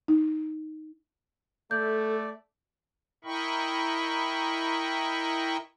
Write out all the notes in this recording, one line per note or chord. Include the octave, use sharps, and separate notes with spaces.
D#4
A3 A4 D5 G6
E4 A#4 D#5 G5 B5 C#6